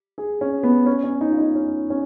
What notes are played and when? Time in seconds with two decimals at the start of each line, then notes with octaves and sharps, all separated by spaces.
0.18 G#4
0.41 C#4
0.63 B3
0.86 C#4
1.04 C#4
1.21 D#4
1.32 F4
1.38 D#4
1.56 C#4
1.90 C#4